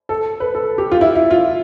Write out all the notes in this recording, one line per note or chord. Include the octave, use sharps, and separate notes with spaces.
A4
B4
A4
G4
F4
E4
E4
F4